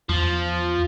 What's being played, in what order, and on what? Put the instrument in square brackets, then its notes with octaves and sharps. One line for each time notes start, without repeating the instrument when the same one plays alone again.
[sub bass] E2 [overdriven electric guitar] F3